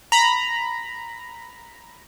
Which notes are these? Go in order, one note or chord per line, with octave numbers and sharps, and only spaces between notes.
A#5 B5